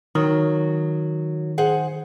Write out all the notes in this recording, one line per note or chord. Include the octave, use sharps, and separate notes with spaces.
D#3 F#3
G#4 C5 F#5